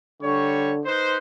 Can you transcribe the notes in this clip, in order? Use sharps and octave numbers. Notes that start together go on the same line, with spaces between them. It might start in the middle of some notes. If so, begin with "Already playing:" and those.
D3 G3 C#5 C#6
D#4 B4 C5